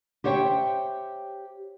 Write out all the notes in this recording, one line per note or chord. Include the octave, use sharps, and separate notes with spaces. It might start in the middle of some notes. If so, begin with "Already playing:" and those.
G4 C5 C#5 E5 F#5 G5